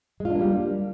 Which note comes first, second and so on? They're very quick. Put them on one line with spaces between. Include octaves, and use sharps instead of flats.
G#3 F4 D4 A#3 G3